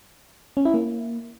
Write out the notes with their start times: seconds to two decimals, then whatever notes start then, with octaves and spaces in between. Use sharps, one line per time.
0.57 C#4
0.65 E4
0.74 A#3